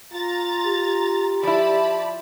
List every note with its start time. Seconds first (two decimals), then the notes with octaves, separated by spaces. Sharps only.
0.13 F4 A#5 A6
0.66 G4
1.43 F3 E4 D5 A5 B5